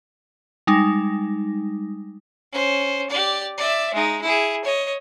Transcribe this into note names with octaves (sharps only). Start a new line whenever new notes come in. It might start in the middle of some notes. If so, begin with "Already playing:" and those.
G3 G#3 D#4
C#4 C5
G4 D5
D5 E5
G#3 D#4
E4 G#4
C#5 D#5